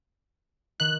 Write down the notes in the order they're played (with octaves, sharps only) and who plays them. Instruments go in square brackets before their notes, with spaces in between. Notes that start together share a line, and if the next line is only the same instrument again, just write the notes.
[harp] D#3 [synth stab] F#6